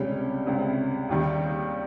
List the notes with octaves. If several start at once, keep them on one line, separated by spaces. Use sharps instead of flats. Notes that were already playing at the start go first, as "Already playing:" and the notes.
Already playing: C#2 C3 G3 C#4
C#2 C3 G3
D#2 D#3 G3